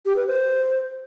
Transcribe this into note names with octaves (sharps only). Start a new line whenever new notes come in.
G4
B4
C5